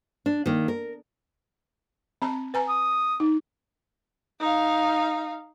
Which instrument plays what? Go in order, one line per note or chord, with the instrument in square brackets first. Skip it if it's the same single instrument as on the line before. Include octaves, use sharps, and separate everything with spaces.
[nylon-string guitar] D4
D#3 A#3
A#4
[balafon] C4 A5 A#5
B4 G#5 A#5
[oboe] D#6
[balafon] D#4
[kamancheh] D#4 F5